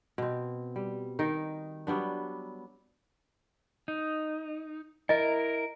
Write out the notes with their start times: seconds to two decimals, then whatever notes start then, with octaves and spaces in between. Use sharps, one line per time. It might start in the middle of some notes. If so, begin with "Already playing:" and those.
0.18 B2 C4
0.76 G3
1.19 D#3 D#4 A#4
1.87 F#3 G3 B3 D4
3.88 D#4
5.09 E4 A#4 D#5